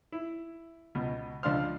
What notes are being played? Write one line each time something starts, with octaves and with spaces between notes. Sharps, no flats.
E4
C#2 B2
C#2 F3 D4 F5 C6 F6